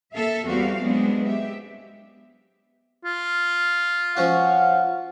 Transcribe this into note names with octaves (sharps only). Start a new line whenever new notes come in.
A#3 A4 E5 F5
E2 G3 C4 F#4 G4 F5
F#3 G#3 B3 C4 D4
G4 E5
F4
F3 C#4 F#4 F5 F#5